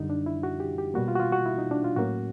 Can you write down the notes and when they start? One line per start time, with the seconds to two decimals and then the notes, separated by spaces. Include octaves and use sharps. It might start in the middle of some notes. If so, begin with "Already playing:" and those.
Already playing: F#2 D3 G3 D#4
0.10 D4
0.26 E4
0.43 F#4
0.60 G4
0.78 G4
0.94 B2 G3 A#3 F#4
1.08 F4
1.15 F#4
1.20 F4
1.32 F#4
1.46 E4
1.58 D#4
1.71 D4
1.84 F4
1.96 A2 F#3 A#3 C#4 F#4